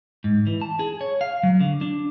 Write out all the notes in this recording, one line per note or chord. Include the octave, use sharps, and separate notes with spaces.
G#2
E3
A5
G#4
C#5
F5
F#3
D3
D4